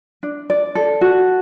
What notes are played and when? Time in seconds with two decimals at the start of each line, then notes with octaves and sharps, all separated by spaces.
0.23 D4
0.50 D5
0.75 A4
1.01 F#4